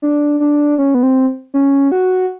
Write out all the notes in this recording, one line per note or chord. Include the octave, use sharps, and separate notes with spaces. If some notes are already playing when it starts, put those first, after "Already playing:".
D4
D4
C#4
B3
C4
C#4
F#4